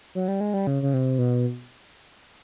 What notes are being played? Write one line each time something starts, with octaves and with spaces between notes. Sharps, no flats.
F#3
G3
G#3
G3
C#3
C#3
C3
B2